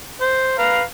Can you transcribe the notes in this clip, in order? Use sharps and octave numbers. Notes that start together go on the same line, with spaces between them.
C5
B4 F5 A#5